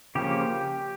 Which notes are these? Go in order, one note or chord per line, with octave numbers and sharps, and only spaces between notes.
C#3 F3 A#3 C#4 G4